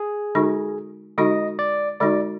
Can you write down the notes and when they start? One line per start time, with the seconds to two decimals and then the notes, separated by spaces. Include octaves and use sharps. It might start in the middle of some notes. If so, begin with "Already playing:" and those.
Already playing: G#4
0.35 D3 G#3 D#4 F#4
1.18 D3 G#3 D#4 F#4 D#5
1.59 D5
2.00 D3 G#3 D#4 F#4 D5